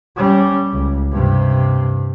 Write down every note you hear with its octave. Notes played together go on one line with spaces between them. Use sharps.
G3 C#4
C#2
G2 C3